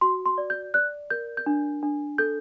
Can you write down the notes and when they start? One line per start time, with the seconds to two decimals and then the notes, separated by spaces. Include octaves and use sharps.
0.01 F#4 C6
0.26 C6
0.38 D5
0.50 G6
0.74 D5 F#6
1.10 A#4 G6
1.37 G6
1.46 D4
1.83 D4
2.18 A4 G6